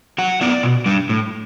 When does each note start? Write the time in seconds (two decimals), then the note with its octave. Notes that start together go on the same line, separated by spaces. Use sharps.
0.18 F#3 F#5
0.41 B3 E4 D5
0.63 B2
0.86 G3 D4
1.09 A2